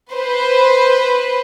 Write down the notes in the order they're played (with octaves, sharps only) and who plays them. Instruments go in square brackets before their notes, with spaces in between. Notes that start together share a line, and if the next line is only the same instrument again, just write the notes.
[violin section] B4 C5